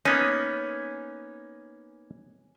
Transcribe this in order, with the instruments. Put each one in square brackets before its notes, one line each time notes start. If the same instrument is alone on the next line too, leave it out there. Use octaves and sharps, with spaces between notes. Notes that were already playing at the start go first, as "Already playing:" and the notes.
[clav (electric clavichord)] A#3 B3 D#4 [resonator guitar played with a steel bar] C#4